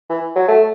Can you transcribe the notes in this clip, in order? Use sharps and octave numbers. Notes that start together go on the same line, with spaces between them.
E3
F#3
A3